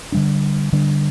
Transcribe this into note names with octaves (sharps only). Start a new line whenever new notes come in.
D3 G3 D4
D3 G3 D4